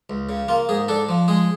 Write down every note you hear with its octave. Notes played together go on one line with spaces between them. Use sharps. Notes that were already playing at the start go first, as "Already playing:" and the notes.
C#2
C#3
A#3 F4
G#2 G#4
D4 A4
F3
G#3 G#4